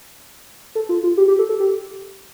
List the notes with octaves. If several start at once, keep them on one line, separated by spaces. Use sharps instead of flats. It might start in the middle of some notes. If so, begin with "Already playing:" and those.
A4
F4
F4
G4
G4
A4
A4
G4